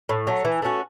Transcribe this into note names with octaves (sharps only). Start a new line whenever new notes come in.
A2
F#3 A3
E3
A3 C#4 F#4